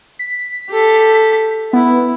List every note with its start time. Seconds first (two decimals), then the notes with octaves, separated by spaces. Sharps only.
0.19 B6
0.70 G4 A4
1.73 B3 E4